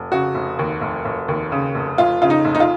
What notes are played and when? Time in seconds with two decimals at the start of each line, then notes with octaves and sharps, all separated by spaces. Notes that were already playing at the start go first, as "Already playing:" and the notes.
Already playing: F1
0.12 C#3 F#4
0.35 F1
0.59 D#2
0.81 F1
1.05 F1
1.28 D#2
1.52 C#3
1.75 F1
1.98 F1 F4
2.22 C#3 F4
2.30 D#4
2.45 F1
2.55 D#4
2.60 F4